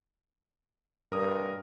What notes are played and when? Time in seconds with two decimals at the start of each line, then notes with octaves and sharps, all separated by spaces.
1.12 G2 A#4 D#6